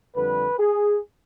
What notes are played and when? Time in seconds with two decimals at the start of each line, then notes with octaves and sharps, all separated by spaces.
0.15 F2 D3 G3 B4
0.59 G#4